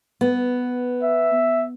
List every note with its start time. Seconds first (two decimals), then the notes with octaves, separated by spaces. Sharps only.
0.21 B3
1.03 E5